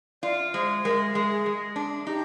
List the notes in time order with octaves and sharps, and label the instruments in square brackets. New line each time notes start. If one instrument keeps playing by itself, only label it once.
[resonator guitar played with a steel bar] F4 [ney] D5
[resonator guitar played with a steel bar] G#3 [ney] C5
[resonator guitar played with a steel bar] G#3 [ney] A#4
[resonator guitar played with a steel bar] G#3 [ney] G#4
[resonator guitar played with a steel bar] G#3
D4
[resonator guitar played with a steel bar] D#4 [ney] G4